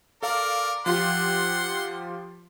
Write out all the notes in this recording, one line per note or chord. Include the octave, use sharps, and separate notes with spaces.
A4 A#4 D5 F5
F3 F4 G4 F#5 C6